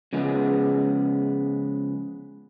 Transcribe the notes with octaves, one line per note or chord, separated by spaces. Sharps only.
C#3 F3 G#3 B3